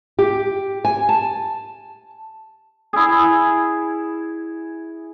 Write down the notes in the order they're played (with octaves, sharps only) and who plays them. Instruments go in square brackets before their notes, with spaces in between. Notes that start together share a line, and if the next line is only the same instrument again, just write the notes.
[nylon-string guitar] G4
G#5
A5
[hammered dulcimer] E4 G#4